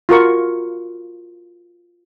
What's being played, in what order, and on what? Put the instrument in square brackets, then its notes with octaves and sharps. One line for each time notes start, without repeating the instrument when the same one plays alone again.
[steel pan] F4 F#4 A#4 C#6